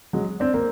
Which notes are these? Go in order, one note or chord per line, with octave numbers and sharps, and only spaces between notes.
F#3 G#3
C4 D4
A#3 C4